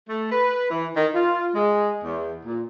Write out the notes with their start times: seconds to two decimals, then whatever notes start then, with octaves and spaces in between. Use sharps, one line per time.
0.09 A3
0.32 B4
0.71 E3
0.96 D#3
1.14 F4
1.55 G#3
2.04 E2
2.45 A#2